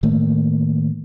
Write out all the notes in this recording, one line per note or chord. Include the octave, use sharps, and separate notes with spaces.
A2 D#3 A3 A#3